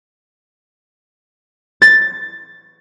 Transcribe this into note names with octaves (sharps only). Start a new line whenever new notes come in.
A6